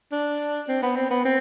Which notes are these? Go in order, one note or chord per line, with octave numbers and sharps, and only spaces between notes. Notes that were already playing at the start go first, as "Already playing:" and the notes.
D4
C4
B3
C4
B3
C4